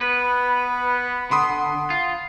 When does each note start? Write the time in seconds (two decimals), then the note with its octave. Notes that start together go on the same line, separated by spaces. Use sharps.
0.01 B3 B4 B5
1.31 D3 F#5 B5 C6 D#6
1.90 F4